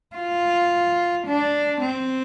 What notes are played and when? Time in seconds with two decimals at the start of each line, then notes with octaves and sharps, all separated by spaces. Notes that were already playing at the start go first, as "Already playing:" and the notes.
0.16 F4
1.27 D4
1.81 C4